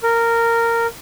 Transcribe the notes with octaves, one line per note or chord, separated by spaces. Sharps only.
A#4